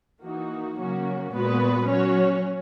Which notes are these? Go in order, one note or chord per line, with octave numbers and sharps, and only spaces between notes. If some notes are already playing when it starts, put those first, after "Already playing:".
E3 A#3 D#4 F#4
C#3 F#3 A#3 C#4 F#4
A#2 G#3 B3 F#4 B4
F#3 C#4 F#4 C#5